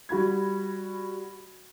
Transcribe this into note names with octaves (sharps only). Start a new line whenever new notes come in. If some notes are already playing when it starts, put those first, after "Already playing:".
G3 F#4 B5 G#6